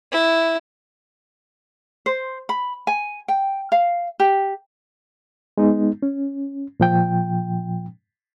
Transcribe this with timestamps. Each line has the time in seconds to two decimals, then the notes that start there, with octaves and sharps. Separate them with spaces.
0.12 E4
2.06 C5
2.49 B5
2.87 G#5
3.28 G5
3.72 F5
4.20 G4
5.58 G#3 B3 D#4
6.03 C#4
6.80 A#2 F3 G5